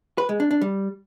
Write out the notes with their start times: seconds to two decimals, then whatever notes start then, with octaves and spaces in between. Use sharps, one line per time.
0.18 B4
0.29 G#3
0.40 D4
0.51 D4
0.61 G3